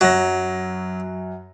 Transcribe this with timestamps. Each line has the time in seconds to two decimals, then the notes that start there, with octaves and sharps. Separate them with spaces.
0.01 F#2 F#3 A#6